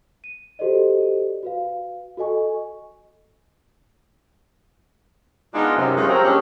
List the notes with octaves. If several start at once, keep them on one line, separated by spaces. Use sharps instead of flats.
D#7
F#4 G4 A4 C5 D5 D#5
F#4 B4 F5
F#4 A4 D#5 G#5 C#6
G#3 B3 D4 D#4 F4
F#2 C3
G3 G#3 B3 C#4 D#4 F4
F3 F#3 C4 G4 A#4 C#5
A#2 G3 G#3 C#4 D4 G#4